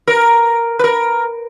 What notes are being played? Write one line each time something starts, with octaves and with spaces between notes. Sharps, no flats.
A#4
B4
A#4